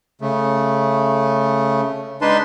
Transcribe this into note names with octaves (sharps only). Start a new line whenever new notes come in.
C#3 A3
G#3 D4 D#4 B4 A5 C6